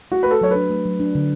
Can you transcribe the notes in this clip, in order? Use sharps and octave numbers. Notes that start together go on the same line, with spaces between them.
A3 F#4
B4
A3 A4
F#3 C#5
D4 B4
A3
F#3
D4
D3